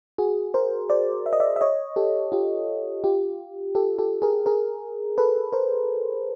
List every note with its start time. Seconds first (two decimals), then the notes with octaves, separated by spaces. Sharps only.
0.18 F#4 G#4
0.54 A#4 C5
0.90 C5 D5
1.26 E5
1.33 D#5
1.40 D5 E5
1.56 E5
1.61 C#5 D#5
1.96 G4 A4
2.32 F4 G4
3.04 F4 G4
3.75 G4 A4
3.98 G4 A4
4.22 G#4 A#4
4.46 G#4 A#4
5.18 A4 B4
5.53 A#4 C5